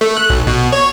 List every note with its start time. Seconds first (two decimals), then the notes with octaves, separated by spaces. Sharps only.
0.01 A3
0.17 F#6
0.30 B1
0.47 B2
0.72 C#5